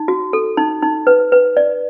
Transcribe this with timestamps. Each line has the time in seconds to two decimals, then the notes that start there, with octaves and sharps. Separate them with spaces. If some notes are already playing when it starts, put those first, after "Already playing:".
Already playing: D#4
0.08 F#4
0.33 A4
0.57 D#4
0.82 D#4
1.07 B4
1.32 B4
1.57 D5